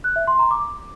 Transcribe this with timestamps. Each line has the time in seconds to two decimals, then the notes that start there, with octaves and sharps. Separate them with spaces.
0.04 F#6
0.16 E5
0.27 C6
0.39 A#5
0.51 D6